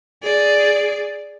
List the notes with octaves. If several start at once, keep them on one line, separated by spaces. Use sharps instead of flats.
G#4 D5